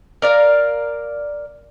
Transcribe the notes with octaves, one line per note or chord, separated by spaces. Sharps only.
A#4 D5 F5